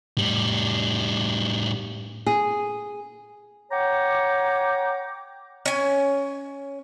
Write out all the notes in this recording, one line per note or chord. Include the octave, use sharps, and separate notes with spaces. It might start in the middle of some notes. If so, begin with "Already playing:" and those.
A2 G3
G#4
C#5 F#5 G5 A#5 D6
C#4 G#5